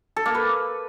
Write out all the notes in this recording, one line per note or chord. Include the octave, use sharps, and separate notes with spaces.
A4
A#3
B4